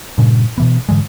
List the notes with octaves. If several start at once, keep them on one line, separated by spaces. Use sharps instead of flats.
G2 A#2 C#3
B2 E3 B3
G#2 D3 E3 G#3